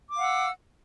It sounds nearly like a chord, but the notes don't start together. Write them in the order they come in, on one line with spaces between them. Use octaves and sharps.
D6 F5 F#5 E6